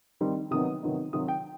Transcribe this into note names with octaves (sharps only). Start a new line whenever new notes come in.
D#3 G3 C4 D#4
C3 D#3 F#3 B3 D#4 D#6
C3 D#3 F#3 B3 D#4
C3 D#3 F#3 C4 D#6
G5